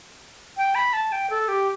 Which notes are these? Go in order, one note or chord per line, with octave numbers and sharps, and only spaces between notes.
G5
B5
A5
G5
A4
G4